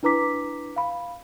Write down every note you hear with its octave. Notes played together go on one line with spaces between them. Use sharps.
D4 E4 B4 A#5 D6 B6
F5 B5